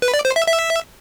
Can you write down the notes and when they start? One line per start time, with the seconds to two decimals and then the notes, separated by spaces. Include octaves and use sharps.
0.02 B4
0.14 D5
0.25 C5
0.36 E5
0.47 E5